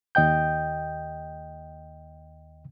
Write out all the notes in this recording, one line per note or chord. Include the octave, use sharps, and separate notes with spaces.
D#2 D#5 G5 G6